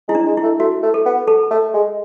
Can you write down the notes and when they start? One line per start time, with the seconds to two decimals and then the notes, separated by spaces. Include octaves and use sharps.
0.08 G#3 E4
0.15 D4
0.26 G#3
0.37 E4
0.43 A3
0.59 A3 F#4
0.83 A3
0.94 A4
1.06 B3
1.28 A4
1.51 A3
1.74 G#3